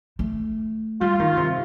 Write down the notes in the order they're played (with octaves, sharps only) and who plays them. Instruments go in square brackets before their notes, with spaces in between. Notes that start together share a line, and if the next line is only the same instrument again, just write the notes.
[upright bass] A3
[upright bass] G3 [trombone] F4
[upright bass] D#3
C3